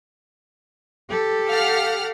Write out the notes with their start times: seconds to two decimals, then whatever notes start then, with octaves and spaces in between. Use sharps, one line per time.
1.09 G4 A4
1.48 F5 F#5 F6